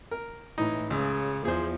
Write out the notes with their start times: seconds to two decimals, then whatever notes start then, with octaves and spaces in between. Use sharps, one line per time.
0.11 A#4
0.58 A2 E3 D#4
0.90 C#2 C#3
1.45 E2 F3 G#4 C5